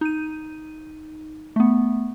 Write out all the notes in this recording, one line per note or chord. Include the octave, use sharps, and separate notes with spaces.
D#4 D#7
A3 B3